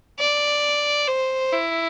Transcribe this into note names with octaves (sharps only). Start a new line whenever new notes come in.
D5
C5
E4